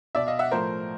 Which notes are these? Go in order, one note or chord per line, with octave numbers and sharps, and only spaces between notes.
B2 D5 E5
D#5 F5
E5 F#5
A2 F3 A#4 C5